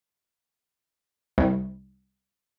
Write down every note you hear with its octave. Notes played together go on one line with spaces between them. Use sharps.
C2